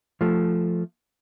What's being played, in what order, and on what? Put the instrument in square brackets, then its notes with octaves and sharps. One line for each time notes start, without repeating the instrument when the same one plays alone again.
[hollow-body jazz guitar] F3 A3